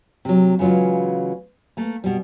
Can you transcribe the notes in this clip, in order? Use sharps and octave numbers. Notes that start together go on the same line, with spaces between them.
C3 F#3
C#3 E3 F#3 G#3 F4
A3 A#3
B2 G3